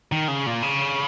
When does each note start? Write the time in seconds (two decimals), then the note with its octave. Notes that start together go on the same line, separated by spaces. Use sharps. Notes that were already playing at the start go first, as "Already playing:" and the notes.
0.12 D#3
0.28 C#3
0.46 A#2
0.62 C#3